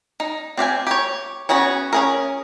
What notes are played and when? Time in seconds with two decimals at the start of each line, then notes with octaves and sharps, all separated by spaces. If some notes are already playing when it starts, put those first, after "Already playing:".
0.20 D#4
0.57 C4 G4 F5 G#5
0.87 G4 C#5
1.49 B3 C#4 F#4 G#4 C#5
1.93 C#4 G#4 A#4